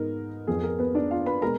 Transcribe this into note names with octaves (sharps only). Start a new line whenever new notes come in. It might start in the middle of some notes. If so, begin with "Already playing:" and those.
Already playing: G#2 B3 D#4 A#4
F2 F3 B3 G#4
A#4
B3 B4
D4 D5
F4 F5
B4 B5
B2 G#3 A#4 A#5